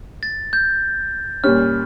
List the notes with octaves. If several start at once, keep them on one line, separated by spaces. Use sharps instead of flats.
A6
G6
A#2 G3 C#4 F6